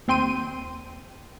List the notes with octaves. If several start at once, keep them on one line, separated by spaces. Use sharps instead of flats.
D#2 C4 G5 C6 D#7